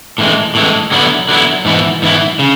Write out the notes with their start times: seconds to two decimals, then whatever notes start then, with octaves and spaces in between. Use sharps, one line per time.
0.18 A2 E3 G#3
0.55 A2 E3 G#3
0.91 D3 F#3 B3 E4
1.29 D3 F#3 B3 E4
1.65 G#2 E3 B3 E4
2.02 G#2 E3 B3 E4
2.39 C#3